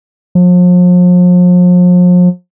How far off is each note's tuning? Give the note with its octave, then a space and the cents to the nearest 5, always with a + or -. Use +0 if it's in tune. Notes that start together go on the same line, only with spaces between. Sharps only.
F3 +40